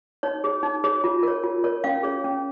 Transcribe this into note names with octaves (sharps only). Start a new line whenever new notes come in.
D#4 C#5
G#4 C#5
D#4
G#4 C#5
F4
A#4 C#5
F4
A#4 C#5
C#4 F5
G#4 C#5
C#4